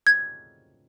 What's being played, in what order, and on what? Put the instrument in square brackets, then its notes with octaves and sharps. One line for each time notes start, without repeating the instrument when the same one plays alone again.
[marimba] G#6